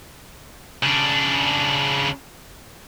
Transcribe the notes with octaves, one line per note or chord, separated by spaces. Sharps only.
C#3 D4